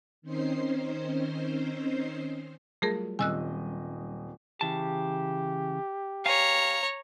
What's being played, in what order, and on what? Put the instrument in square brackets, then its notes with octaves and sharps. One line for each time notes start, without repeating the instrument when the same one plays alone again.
[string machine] D#3 C4 C#4 D#4 C5 C7
[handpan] F#3 G3 F4 [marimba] A3 G#4 A#4
[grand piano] D#1 D#5 [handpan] G3 C4 C#4 [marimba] G#5 E6 F#6
[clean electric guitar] C#3 E3 A5 [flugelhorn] G4
[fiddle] C#5 A#5 [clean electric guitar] F5 G#5